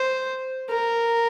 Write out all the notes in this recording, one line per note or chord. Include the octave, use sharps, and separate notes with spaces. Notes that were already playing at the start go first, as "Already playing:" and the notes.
Already playing: C5
A#4